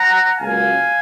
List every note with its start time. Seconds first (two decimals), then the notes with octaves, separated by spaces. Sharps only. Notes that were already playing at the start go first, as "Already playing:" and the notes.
Already playing: F#5 A#5
0.38 C#2 C#3 F#3 A#3 F5 G#5